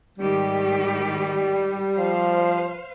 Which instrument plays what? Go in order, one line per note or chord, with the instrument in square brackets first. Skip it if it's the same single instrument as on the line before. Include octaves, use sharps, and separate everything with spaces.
[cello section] G#2 D#3 G4 [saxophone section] G3
[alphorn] F3 [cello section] C5 F5